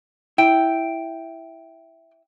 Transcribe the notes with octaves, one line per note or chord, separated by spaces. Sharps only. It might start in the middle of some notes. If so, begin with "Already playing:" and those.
E4 G5